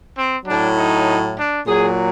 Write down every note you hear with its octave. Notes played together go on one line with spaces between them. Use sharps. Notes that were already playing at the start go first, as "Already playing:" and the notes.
C4
A2 F#3 D4
D#4
D4
A#2 F#3 G#4